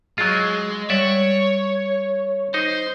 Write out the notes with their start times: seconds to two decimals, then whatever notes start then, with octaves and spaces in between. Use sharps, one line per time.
0.18 F#3 G#3 F4
0.90 G3 C#5 D5 E5 F#5
2.54 D#4 C5